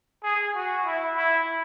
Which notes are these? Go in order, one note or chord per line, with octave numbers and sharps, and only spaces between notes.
G#4
F#4
E4
E4